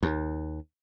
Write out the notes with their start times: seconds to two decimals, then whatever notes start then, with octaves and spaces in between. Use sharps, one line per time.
0.03 D#2